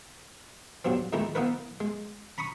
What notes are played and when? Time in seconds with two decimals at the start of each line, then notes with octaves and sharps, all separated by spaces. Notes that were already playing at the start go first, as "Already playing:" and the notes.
0.85 E2 G2 B2 F#3 C4
1.13 F2 D#3 G#3 A3 E4 A#5
1.35 A#3 B3 D#4 E4 A#4 B4
1.80 G#3
2.38 A#5 B5 C#6 D#6